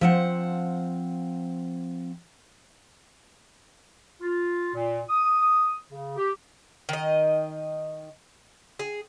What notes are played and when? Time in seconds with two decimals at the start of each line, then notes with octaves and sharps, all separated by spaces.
0.01 F3 C4 F#5
4.21 F4
4.74 A#2
5.10 D#6
5.90 C#3
6.17 G4
6.89 D#3 D#5
8.79 G#4